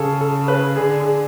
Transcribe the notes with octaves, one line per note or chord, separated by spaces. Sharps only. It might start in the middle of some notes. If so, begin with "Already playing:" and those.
Already playing: C#3 G#4 A4
A4
B4
D3 G#4
G#4